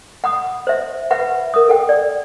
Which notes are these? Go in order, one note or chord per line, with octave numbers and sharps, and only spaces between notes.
F#5 B5 D#6
C5 E5
B4 E5 F#5 B5
A#4 D#6
A4 F#5 G5
D5